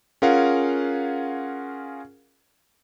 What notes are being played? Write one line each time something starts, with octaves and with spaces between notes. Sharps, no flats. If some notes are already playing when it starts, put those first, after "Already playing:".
C#4 F4 G#4 A#4 F5 F#5